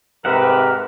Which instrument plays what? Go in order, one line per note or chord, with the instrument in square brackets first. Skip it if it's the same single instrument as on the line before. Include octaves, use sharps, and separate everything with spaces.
[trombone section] G#2 C3 B4 [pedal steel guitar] G4 E5 F#5 [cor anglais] A#4